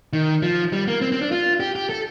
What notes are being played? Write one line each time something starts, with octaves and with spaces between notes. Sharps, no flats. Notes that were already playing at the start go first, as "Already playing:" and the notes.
D#3
F3
G3
A#3
C4
C4
D4
F4
G4
G4
A4